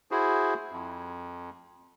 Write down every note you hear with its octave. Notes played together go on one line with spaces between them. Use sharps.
E4 F#4 G#4 C5
F2